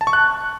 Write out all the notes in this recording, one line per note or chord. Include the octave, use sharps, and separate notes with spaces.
A5
C#6
F#6